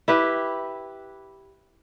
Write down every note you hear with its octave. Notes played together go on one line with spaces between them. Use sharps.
E4 G4 B4